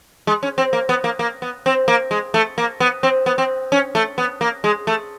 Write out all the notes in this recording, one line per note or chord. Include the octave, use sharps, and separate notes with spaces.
G#3
C#4
C4
A#3
B3
A#3
A#3
B3
C4
A#3
G#3
A3
A#3
B3
C4
B3
C4
C#4
A3
B3
A#3
G#3
A3